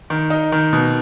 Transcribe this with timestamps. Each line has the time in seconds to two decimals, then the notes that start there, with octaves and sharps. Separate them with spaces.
0.10 D#3
0.30 D#4
0.52 D#3
0.73 B2